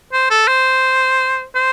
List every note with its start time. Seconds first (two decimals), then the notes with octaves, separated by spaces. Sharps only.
0.13 C5
0.30 A4
0.47 C5
1.55 C5